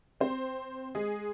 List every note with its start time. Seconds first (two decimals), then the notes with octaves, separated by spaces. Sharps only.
0.20 C4 C5
0.95 G#3 G#4